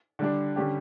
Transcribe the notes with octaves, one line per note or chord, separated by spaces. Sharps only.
D3 G3 D4
D3 G3 C#4 G4